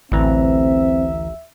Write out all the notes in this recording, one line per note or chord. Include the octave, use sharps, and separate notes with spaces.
A1 D2 E3 C4 E5 A#5